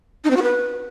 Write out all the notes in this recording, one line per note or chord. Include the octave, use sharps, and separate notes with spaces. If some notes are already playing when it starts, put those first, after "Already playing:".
D#4
C4
F#4
B4